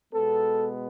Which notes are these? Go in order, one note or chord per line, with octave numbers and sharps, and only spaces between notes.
B2 G#3 B3 A4